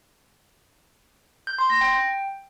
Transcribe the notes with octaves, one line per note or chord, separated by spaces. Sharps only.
G6
C6
A#6
G5